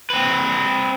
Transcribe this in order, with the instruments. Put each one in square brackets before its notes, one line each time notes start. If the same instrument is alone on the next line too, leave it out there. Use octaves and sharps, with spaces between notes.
[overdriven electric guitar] C4 B4